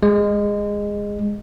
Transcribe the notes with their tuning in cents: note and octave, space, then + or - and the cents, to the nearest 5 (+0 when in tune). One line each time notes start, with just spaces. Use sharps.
G#3 -15